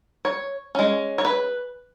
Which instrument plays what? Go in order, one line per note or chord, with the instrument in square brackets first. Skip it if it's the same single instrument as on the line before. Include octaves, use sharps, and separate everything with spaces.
[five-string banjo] C#5
G#3 C#4
C#5
B4